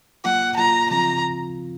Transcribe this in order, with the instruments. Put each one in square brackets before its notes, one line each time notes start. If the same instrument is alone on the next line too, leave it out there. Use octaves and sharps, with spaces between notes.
[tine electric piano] F#3 A#3 F4 [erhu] F#5
[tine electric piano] F#3 A#3 F4 [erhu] A#5
[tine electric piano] C#3 F3 C4 F4 [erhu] A#5